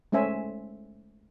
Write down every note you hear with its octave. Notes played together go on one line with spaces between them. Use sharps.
G#3 A3 C#4 C5 E5 G#5